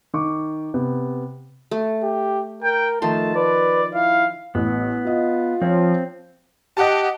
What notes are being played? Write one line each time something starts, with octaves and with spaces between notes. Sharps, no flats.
D#3 C#6 D6
C3 B3
A3
G4
A#4 G5
D#3 F3 A3 A5 C6
B4 D5
E4 F5
A1 B3
F4 D#5
F3 C4 C5 C#5
G4 D#5 F#5 A5